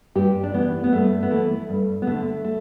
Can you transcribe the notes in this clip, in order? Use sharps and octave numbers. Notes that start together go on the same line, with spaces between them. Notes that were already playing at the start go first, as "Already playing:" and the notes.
G2 G4
D4
E3 B3
B3
G2 A3
B3
E3 A3
G2
B3
D3 A3
A3